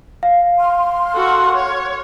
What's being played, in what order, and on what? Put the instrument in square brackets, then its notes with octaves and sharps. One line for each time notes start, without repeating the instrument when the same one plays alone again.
[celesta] F5
[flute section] C6 F6
[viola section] F#4 A4 F#5
C#5